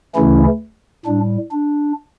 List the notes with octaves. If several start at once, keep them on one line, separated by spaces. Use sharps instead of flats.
D2 C#3 E3 A3 C#4 E4
A2 G3 D4
D4